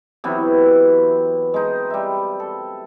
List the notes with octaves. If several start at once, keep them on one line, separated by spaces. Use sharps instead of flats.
C3 E3 F#3 B3
G#3 D#4
G3 E5
A4